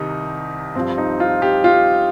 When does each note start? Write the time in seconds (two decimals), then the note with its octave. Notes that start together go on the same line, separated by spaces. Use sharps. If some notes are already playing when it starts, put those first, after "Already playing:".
Already playing: C2 C3 D#3 D#4
0.75 G2 F3 C4
0.98 D#4
1.20 F4
1.42 G4
1.64 F4